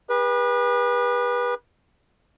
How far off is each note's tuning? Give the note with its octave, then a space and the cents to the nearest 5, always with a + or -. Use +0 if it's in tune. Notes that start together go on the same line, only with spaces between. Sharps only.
G4 +45 B4 -25